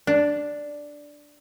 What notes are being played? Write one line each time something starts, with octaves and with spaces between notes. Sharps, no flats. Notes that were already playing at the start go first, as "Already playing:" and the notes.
D4